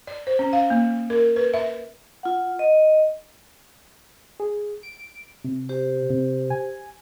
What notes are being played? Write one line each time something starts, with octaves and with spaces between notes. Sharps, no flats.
D5
C5
C#4
F5
A#3
A#4
B4
E5
F4 F#5
D#5
G#4
D7
C3
G4 C5
C3
G#5